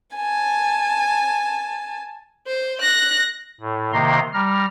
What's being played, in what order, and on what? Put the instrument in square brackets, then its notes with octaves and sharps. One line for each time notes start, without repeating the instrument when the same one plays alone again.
[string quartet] G#5 A5
[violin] C5
F#6 A#6
[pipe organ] A2
C3 D#3 A#3 A#5 C6
G3 A#5 F6